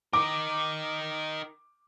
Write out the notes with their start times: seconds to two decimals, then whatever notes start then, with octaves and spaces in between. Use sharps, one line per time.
0.13 D#4 A#4 D6